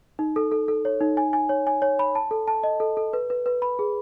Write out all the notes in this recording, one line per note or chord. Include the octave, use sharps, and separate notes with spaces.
D#4
A4
A4
A4
C#5
D#4
G#5
G#5
C#5
G#5
C#5
B5
A5
A4
A5
D#5
A4
A4
B4
B4
B4
B5
G#4